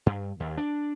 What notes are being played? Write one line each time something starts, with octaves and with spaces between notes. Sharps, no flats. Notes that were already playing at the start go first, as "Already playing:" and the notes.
G2
D#2
D4